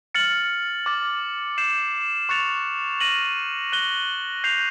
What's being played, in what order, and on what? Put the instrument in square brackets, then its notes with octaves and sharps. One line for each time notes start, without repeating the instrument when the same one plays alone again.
[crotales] F6 A6 C#7 F#7
D6 F6 A6
G6 C7 E7
C#6 F#6 A6 C#7 F7
F6 A#6 D#7 F#7
F#6 A#6 D#7 G7
G6 C7 F7